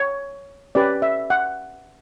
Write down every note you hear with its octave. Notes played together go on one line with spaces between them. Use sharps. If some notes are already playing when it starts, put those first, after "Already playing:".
Already playing: C#5
C#4 G4 B4 D5
E5
F#5